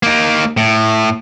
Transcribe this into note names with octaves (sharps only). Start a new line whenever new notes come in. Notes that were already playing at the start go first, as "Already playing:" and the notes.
A#3 D#4
A2